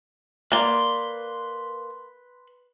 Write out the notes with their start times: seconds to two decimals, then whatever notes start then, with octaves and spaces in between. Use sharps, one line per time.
0.52 A#3 B4 D5 C6